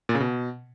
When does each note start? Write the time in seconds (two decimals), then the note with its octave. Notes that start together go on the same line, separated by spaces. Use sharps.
0.09 A#2
0.15 C#3
0.20 B2